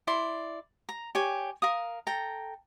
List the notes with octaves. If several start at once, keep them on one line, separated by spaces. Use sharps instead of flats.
E4 D5 C6
A#5
G4 C#5 G#5
A#4 F5 D#6
A4 G5 A#5